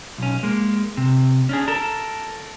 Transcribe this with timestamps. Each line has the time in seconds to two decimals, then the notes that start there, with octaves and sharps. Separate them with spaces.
0.18 B1 C#4
0.43 G#3 A#3
0.97 C3
1.49 C#4 D4 G#4
1.68 A4 A#4